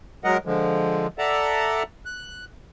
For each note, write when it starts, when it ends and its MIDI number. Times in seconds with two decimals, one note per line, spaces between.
0.24 0.37 54
0.24 0.37 56
0.24 0.37 70
0.24 0.37 75
0.24 0.37 78
0.46 1.07 50
0.46 1.07 53
0.46 1.07 56
1.19 1.83 69
1.19 1.83 74
1.19 1.83 76
1.19 1.83 78
1.19 1.83 81
1.19 1.83 82
2.06 2.45 90